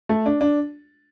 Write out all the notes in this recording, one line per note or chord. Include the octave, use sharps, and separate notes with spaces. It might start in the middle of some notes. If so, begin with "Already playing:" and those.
A3
D4
D4